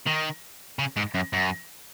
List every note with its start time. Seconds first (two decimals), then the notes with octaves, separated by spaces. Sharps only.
0.07 D#3
0.79 C#3
0.97 G#2
1.15 F#2
1.33 F#2